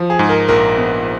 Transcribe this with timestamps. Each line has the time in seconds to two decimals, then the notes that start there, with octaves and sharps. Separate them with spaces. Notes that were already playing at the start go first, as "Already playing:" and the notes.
Already playing: F3
0.10 G#4
0.19 G#2
0.29 A#4
0.48 A#1 A#4
0.78 B3